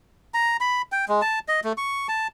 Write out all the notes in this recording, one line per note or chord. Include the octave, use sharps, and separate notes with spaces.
A#5
B5
G5
G#3
A5
D#5
A3
C#6
A5